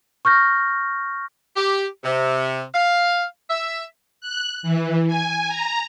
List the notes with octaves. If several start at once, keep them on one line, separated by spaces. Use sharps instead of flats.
C#6 F6 G6 A#6
G4
C3
F5
E5
F#6
E3
G#5
A#5